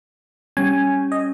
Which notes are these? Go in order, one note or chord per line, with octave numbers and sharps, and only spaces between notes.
G3 C#4 G#5
D#5